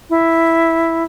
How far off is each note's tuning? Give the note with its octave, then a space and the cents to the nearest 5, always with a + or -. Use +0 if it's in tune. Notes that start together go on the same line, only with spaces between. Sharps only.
E4 +0